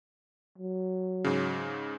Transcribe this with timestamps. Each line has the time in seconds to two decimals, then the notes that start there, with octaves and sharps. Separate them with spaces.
0.58 F#3
1.24 G#2 C#3